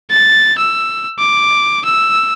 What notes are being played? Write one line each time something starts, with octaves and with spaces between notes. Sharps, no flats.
A6
E6
D6
E6